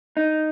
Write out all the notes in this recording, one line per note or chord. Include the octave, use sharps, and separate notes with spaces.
D#4